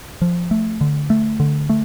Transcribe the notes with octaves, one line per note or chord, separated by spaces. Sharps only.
F3
A3
D3
A3
D3
A3